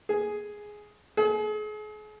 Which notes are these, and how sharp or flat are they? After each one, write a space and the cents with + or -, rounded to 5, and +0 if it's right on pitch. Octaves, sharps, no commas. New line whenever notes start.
G#4 +5
G#4 +40